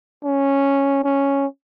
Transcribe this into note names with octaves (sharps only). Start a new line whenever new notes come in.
C#4
C#4